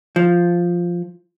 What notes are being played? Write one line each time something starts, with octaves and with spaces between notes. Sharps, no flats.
F3